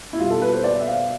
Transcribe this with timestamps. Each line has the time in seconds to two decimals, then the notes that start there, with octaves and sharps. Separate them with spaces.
0.13 E4
0.19 G3 F4
0.23 B2
0.30 A4
0.42 B4
0.54 C5
0.64 D5
0.80 E5
0.87 F5